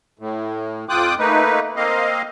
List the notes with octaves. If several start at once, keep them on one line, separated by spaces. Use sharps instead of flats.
A2
F2 F4 G5 D6 D#6 F#6
A3 A#3 D#4 B4
A#3 C4 D#5 F5